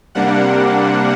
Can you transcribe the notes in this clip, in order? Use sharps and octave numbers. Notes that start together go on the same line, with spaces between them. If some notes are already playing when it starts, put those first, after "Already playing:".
C3 G3 A#3 D4 F#5